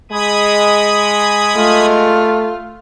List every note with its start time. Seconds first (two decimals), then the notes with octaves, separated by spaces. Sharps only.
0.11 G#3 B5 D#6 G#6
1.56 A3 F4